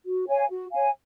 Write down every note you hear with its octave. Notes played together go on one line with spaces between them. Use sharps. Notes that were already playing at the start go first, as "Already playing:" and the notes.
F#4
C#5 F5 G#5
F#4
C#5 F5 G#5